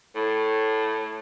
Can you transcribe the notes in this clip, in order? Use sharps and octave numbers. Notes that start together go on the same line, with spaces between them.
A2